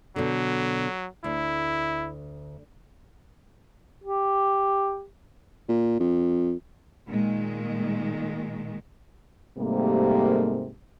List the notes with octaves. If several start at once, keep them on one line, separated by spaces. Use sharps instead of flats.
B2 D3 F#3
D2 E4
G4
A#2
F2
A#2 D#3 G#3
G#2 C3 G3 A3 A#3